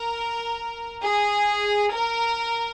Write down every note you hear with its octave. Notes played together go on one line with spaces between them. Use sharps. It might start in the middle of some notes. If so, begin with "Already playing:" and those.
Already playing: A#4
G#4
A#4